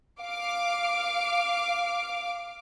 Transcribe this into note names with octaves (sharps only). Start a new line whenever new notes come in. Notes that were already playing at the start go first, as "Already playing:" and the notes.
F5 D6